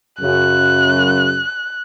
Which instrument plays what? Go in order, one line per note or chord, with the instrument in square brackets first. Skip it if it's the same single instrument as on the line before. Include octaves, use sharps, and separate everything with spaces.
[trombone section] F#2 C#3 [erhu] F#6